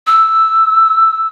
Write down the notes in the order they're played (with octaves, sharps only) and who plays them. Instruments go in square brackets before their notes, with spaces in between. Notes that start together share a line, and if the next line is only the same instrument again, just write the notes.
[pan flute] E6